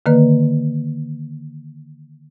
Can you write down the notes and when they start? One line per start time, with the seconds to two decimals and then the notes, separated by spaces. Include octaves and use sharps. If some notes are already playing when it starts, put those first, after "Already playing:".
0.06 D3 D#3 A#3 B4